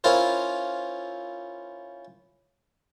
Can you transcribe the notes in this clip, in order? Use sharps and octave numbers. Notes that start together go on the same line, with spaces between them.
C#4 E4 F4 A#4 C5